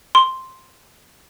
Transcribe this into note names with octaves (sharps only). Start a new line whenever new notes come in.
C6